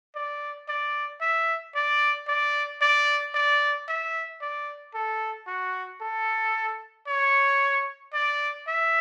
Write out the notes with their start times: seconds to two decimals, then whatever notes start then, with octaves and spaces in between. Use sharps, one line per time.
0.15 D5
0.69 D5
1.21 E5
1.75 D5
2.28 D5
2.82 D5
3.34 D5
3.88 E5
4.42 D5
4.94 A4
5.47 F#4
6.01 A4
7.07 C#5
8.14 D5
8.67 E5